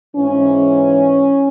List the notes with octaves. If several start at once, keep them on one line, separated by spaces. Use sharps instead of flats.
G#2 E3 C#4